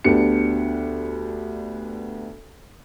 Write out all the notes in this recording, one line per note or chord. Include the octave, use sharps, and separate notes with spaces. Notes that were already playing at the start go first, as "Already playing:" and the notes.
D2 B3 D4 G4 C#7